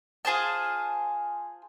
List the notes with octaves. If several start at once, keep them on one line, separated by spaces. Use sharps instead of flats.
F4 G#4 C5 A5